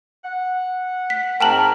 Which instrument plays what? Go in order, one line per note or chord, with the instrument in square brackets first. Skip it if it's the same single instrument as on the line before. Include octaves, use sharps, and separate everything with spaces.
[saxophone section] F#5
[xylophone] B6
[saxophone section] G#2 C4 [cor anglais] A#4 [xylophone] G5 A5 F#7